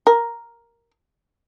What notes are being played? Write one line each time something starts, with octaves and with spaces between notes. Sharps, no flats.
A#4